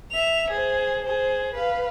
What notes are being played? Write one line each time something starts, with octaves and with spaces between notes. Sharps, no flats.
E5 F7
G#4 C5
G#4 C5
B4 F5